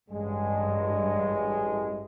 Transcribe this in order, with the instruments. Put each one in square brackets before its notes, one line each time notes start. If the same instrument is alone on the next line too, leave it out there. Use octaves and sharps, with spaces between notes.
[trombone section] A1 G#3 [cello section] G2